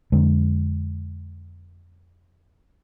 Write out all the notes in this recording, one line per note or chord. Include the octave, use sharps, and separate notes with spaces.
F2 D3 G#3